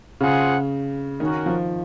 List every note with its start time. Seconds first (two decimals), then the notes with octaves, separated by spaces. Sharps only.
0.20 C#3 F4 G#4 C5 F#5
1.20 D#3 C#4 F#4 A#4
1.46 F3